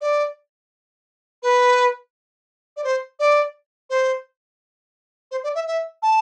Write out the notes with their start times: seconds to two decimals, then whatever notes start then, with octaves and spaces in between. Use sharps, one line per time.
0.01 D5
1.43 B4
2.77 D5
2.84 C5
3.20 D5
3.90 C5
5.31 C5
5.44 D5
5.55 E5
5.67 E5
6.02 A5